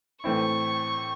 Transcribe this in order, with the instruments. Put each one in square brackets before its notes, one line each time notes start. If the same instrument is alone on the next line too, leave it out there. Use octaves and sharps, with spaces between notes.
[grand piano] A2 E3 A3 C4 E4 [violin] C#6